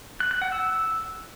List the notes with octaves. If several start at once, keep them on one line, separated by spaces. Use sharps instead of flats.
F#6
F#6
F#5
E6